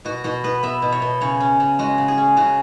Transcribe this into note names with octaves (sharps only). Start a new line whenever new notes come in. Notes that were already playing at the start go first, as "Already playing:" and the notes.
B2 F#4
B2 F#4
B3 B4
B3 E5
B2
C#5
B2
C#3 C#5
C#4
C#3
G#3 F#4
C#3
G#4
C#4
C#3 F#4